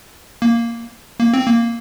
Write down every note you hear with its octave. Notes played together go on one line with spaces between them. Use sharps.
A#3
A#3
C4
A#3